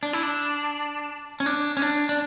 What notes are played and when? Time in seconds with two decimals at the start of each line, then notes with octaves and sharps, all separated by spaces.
0.03 D4
0.13 E4
0.23 D4
1.40 C#4
1.46 D4
1.77 C#4
1.82 D4
2.09 D4